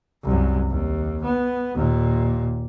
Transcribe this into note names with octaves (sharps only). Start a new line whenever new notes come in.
C2 F#2
D#2
B3
D#2 A#2